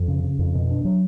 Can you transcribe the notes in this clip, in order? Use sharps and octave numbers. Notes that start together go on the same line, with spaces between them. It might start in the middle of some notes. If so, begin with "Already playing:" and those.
Already playing: F2
C#3
C#3
F2
B2
D4
F#3